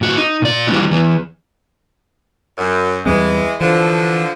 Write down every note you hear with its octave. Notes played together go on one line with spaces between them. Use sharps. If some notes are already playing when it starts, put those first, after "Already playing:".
A2 F#4
D#4
A#2 D5
E3 G3 G#3 B3 D#4 F#4
E2 E3 B3
F#2
E2 E3 G3 G#3 C4
D3 E3 F3